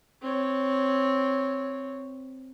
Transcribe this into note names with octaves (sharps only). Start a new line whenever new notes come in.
C4 C#5